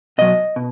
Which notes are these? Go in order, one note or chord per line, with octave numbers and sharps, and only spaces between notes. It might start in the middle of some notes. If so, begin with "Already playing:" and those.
B2 F#3 D#5
B2